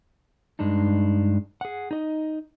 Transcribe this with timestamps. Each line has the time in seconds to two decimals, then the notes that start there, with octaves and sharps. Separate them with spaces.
0.59 G2 G#3 D4 D#4
1.61 G#4 F#5
1.91 D#4 D#5